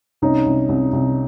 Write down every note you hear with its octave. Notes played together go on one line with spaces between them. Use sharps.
C2 C#4 D#4
C2
C2
C2